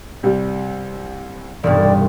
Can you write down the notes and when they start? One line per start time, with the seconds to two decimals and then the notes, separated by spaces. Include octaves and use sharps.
0.23 C2 G3
1.64 E1 C2 G2 D5